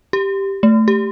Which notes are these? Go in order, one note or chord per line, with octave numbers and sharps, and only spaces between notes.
G4
A3
G4